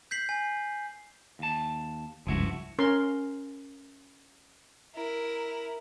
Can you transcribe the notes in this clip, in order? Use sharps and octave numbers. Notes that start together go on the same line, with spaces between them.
G6 B6 C7 F#7
G#5
D#2 A5
F1 C#2 G2 F3 E4 F#4
C#4 A#4 C6
E4 A#4